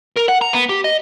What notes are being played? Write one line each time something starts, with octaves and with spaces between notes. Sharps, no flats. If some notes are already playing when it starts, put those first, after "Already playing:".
A#4
F#5
A#5
B3
G4
D#5